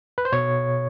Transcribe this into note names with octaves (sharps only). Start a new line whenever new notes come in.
B4
C5
B2 C#5